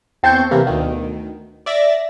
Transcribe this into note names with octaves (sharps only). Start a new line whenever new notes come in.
E2 C4 A5 C6 C#6 G6
C3 E3 A#3
D2 B2 D#3
D5 E5 A6 A#6